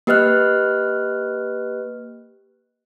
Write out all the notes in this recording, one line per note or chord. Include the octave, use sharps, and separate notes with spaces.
A#3 G4 B4 D#5 F6 F#6